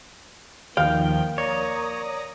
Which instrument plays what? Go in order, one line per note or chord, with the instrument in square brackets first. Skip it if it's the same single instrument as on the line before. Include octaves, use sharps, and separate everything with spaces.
[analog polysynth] D#2 D#3 F3 [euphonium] A#3 [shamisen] F5 [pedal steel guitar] G5
[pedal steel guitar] C#5 [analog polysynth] D5 A#5 D#6